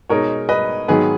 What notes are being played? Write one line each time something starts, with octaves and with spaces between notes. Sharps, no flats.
B2 G#3 D#4 A#4 C#5
B4 D#5
G#2 D#3 F#3 B3 G#4 B4